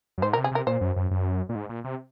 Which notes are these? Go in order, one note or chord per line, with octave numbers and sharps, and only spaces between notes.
F#2
G#2 C5
A#2 A#4
C3
G#4
C3 A#4
A#2 C5
F#2
F#2
F#2
A#2
G#2
A#2
C3